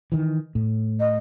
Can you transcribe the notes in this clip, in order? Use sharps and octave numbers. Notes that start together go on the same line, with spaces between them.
D#3 E3
A2
D#5